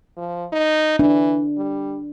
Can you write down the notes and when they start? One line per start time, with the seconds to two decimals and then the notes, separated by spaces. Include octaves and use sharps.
0.17 F3
0.53 D#4
0.99 E3 D4
1.58 G3